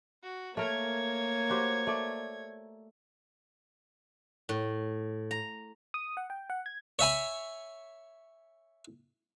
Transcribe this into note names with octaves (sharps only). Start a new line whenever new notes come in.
F#4
A3 A#3 A#4 C#5 G#6
F#4 G4 C5
A3 D5
A2
A#5
D#6
F#5
G5
F#5
G#6
C#5 E5 G#5 B5